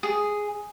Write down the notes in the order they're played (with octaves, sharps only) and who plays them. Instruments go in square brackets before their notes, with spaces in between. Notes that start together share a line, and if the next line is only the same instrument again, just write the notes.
[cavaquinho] G#4